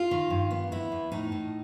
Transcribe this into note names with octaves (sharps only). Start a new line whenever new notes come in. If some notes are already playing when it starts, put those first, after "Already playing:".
Already playing: F4
D#3
G2
B3
E2 E4
E2
A2 D#4
A2